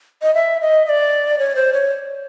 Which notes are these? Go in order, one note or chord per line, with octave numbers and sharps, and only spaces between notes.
D#5
E5
D#5
D#5
D5
C#5
C5
C#5